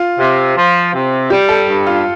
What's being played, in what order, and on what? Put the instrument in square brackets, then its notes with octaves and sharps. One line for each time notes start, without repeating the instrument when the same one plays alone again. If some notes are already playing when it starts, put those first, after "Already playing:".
Already playing: [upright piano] F4
[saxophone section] C3
F3
C3
[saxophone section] G3 [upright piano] G4
[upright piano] A4
[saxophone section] G2
[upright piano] F4